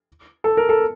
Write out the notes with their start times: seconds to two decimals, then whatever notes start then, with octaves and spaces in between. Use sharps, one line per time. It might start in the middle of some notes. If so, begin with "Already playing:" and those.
0.44 A4
0.57 A#4
0.69 A4